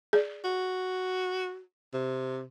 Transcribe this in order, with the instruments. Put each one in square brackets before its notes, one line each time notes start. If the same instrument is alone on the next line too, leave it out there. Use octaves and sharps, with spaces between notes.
[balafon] G#4 D5
[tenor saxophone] F#4
C3